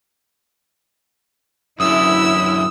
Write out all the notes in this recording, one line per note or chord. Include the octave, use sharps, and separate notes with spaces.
F#2 D3 E4 D#6 E6